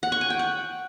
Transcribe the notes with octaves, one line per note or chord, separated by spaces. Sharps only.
F#5
C#6
G#5
G5
F#5